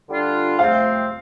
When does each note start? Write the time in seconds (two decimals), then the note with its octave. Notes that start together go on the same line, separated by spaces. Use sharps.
0.09 D3 G3 D4 F4
0.59 C3 F3 A3 C4 F5